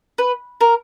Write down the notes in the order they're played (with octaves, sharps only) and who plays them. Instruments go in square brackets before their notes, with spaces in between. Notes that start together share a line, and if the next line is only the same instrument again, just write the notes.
[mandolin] B4
A#4